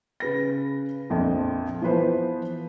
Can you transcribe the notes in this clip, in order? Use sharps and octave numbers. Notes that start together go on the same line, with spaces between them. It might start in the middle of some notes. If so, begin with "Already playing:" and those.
C#3 B4 A#6
A#1 F2
E3 F3 B3 B4 C5